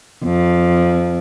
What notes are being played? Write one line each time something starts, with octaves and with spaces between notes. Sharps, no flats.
F2